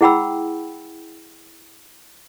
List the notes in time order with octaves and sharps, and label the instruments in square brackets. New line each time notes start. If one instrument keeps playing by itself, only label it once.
[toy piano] E4 G#4 F#5 G5 B5 E6